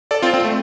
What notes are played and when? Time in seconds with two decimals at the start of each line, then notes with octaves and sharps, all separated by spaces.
0.11 A4 D5
0.22 C4 F4
0.34 C4
0.45 A3